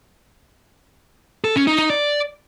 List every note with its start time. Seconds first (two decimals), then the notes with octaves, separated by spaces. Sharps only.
1.44 A4
1.56 C#4
1.67 D#4
1.79 D#4
1.90 D5